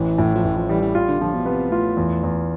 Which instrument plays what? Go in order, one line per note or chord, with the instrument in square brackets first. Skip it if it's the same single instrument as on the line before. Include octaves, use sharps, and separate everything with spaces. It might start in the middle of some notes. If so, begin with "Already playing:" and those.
Already playing: [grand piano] A1 [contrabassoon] E3
[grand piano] A2
[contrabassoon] F3
[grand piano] A1 [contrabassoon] E3
[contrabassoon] F3
[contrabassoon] E3 [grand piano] G3
[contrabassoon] E3
[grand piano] F4
[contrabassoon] D3
[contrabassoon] D3 [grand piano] F3
[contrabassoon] B2
[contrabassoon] C3 [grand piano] B3
[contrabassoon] A2 [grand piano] F4
[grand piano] E2
E2